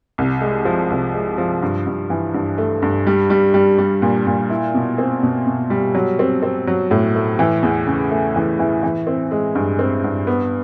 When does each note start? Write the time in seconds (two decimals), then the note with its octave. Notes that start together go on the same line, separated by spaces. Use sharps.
0.18 C2
0.41 G#3
0.65 F3
0.90 C2
1.14 G#3
1.38 F3
1.62 G2
1.86 G2
2.10 E3
2.34 G2
2.58 A3
2.82 G2
3.07 G3
3.30 G3
3.54 G3
3.78 G3
4.02 A#2
4.27 A#2
4.50 E4
4.74 B2
4.98 C4
5.23 B2
5.47 B2
5.70 G3
5.95 F#3
6.19 C4
6.43 C4
6.67 F#3
6.91 A2
7.15 A3
7.39 E3
7.63 E2
7.87 C#3
8.11 A3
8.36 E3
8.59 E3
8.83 E3
9.07 C4
9.31 G#3
9.55 G2
9.79 C4
10.04 G2
10.27 B3